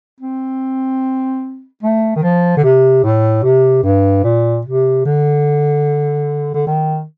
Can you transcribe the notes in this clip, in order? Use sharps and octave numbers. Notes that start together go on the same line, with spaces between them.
C4
A3
D#3
F3
D3
C3
A2
C3
G2
A#2
C3
D3
D3
D#3